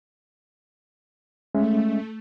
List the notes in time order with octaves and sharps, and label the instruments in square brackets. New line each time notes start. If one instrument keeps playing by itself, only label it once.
[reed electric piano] G#3 C#4 E5 [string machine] A3